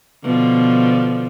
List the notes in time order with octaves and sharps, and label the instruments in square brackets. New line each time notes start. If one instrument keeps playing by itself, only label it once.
[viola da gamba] B2 D3 F3